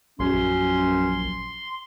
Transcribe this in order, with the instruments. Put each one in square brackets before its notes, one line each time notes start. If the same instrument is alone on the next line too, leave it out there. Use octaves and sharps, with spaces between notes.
[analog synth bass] A#1 [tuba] F#2 [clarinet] C#4 [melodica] C6